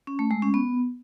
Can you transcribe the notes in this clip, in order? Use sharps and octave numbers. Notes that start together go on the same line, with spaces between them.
C#4
A3
G#3
C#4
B3